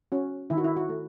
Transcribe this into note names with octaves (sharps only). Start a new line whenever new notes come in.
C#4 F#4
D#3 E4
F#4
E4
F#4
A3